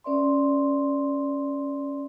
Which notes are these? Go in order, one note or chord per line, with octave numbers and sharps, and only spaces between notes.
C#4 B4 D5 E5 C6